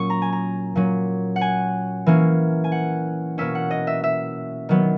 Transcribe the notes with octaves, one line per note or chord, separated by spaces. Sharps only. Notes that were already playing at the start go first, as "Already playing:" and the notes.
Already playing: A#2 F#3 C#4 C#6 D#6
A#5
G#5
A#5
A#2 F#3 C#4
F#5
G#5
E3 A#3 C#4
G#5
F#5
B2 A#3 C#4 E5
F#5
D#5
E5
E5
D#3 F#3 B3